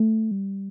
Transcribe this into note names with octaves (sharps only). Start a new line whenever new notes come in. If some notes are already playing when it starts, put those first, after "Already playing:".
Already playing: A3
G3